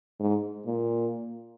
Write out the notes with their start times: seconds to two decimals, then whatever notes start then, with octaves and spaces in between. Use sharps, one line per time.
0.20 G#2
0.66 A#2